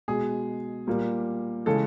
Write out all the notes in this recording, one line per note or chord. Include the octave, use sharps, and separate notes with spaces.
B2 G#3 G#4
A#2 G3 A#3
C#3 E3 G#3 A4